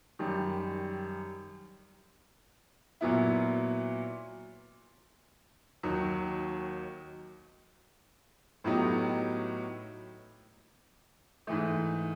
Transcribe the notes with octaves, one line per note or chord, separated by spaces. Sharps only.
F#2 D#3 G3
A#2 F#3 B3 E4
D#2 D#3 F#3
A2 F#3 B3 D#4 G4
G#2 E3 A3